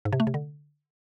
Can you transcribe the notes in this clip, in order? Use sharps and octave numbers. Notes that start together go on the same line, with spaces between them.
G#2
C3
A3
C3
D3